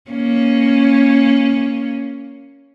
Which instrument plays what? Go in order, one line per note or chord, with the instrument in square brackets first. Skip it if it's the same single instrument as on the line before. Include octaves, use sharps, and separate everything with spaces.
[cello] A#3 C#4